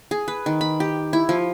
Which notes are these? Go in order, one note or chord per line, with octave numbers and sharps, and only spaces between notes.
G#4
B4
D#3
B5
G4
E4
F3